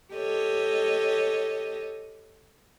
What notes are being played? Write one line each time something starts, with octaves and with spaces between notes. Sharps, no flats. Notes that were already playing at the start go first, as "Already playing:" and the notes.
G4 A4 C#5 D#5